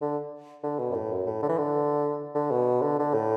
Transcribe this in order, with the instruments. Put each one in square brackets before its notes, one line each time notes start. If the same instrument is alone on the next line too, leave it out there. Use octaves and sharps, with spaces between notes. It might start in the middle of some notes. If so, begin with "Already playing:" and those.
[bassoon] D3
D3
B2
F#2
A2
F#2
A2
D3
E3
D3
D3
B2
D3
D3
A2